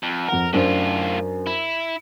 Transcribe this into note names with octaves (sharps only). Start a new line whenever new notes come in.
F2
F2 A#4 F#5
F#2 A2 D4 F4 C5
E4